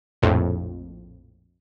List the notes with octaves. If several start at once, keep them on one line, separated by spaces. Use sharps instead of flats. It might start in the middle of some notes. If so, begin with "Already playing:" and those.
A#1 F2 A2